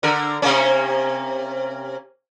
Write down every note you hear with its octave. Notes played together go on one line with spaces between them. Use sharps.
D3 A#4
C3 A#3 C#4